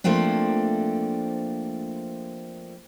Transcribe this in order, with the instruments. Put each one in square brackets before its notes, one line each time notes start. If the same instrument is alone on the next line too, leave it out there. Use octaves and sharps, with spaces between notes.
[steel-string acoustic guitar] F3 A3 A#3 C4 D4